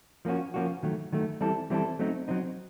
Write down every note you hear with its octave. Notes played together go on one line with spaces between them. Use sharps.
F3 A#3 C#4 F#4
F3 A#3 C#4 F#4
D#3 F#3 A3
D#3 F#3 A3
E3 G3 C4 E4 A4
E3 G3 C4 E4 A4
F#3 A3 C4 D#4
F#3 A3 C4 D#4